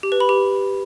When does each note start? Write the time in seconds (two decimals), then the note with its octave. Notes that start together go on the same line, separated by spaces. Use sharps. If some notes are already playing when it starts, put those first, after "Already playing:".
0.03 G4
0.12 B4
0.20 B5
0.29 G4